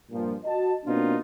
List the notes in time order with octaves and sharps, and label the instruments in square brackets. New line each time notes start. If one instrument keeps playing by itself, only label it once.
[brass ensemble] G2 A#2 F3
F#4 D#5 A5
B2 A#3 C4 D4 D#4 F4